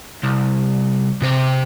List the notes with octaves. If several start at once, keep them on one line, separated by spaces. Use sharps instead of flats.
C2
C3 C5